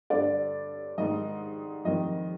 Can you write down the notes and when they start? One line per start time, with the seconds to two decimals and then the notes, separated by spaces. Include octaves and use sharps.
0.10 G2 D3 D5
0.98 G#2 D#3 D#5
1.85 F2 D#3 D#5